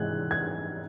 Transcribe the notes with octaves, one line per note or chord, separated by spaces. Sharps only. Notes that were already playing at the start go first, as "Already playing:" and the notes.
Already playing: G#2 E3 G#3 F#6 G#6
G#6